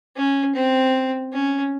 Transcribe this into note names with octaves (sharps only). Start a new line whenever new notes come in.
C#4
C4
C#4